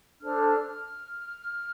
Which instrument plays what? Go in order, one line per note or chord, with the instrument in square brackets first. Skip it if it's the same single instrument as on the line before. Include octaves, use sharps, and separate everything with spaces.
[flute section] D4 A4 C5 F6